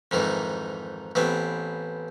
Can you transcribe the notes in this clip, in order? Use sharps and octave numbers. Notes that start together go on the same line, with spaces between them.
F2 G#2 D#3 E3
A1 B3 C4